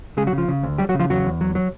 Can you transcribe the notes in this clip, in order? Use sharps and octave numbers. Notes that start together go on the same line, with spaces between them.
C#3 G#3 G#4
F#3 F#4
C#3
F3 F4
C#3
D2
F#3 G3 G4
F#3 F#4
C#3
F3 F4
E2 F#3 F#4
E2
F#3
F#3